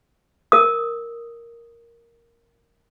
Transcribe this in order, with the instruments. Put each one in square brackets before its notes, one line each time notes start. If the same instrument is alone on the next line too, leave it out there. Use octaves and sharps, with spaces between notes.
[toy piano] A#4 D#6